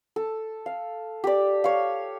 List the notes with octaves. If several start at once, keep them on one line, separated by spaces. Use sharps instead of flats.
A4
F5
G4 D5
C#5 F5